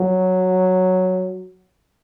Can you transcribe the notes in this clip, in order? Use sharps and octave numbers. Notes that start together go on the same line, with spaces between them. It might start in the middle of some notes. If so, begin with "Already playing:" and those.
Already playing: F#3